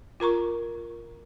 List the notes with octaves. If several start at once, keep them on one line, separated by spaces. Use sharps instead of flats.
F4 A#4 A#5 C#6